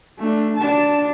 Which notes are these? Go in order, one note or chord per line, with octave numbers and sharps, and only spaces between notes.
A3 D4
D4 A5